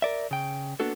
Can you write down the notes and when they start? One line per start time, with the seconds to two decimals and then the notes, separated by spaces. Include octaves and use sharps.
0.02 A#4 D5 E5
0.31 C#3 G5
0.80 A#3 B3 D4 F#4 A4